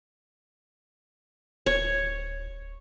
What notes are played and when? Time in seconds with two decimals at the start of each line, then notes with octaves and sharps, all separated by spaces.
1.66 D1 C#5